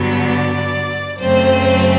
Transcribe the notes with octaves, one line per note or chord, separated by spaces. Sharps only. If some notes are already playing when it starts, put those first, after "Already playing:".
Already playing: G2 D3 F#3 B3
D5
F#2 C#3 F#3 A3 C4 C5